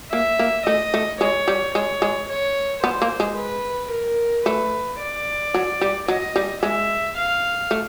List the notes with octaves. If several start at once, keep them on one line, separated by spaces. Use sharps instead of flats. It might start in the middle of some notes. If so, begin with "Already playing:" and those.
A#3 E5
A#3
A3 D#5
A3
G#3 C#5
G3
G#3 C#5
G#3
C#5
B3 C5
A#3
G#3
B4
A#4
A3 B4
D5
F#3
G3
F#3 D#5
G3
G#3 E5
F5
A3